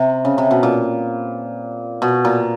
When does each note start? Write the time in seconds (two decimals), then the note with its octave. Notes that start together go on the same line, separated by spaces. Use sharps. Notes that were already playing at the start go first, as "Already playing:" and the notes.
Already playing: C3
0.25 C#3
0.38 C3
0.51 B2
0.63 A#2
2.02 B2
2.25 A#2